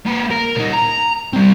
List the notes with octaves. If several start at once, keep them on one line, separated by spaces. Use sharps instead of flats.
A#3 B4
A#4
A#2 D#4
A#5
G3 C4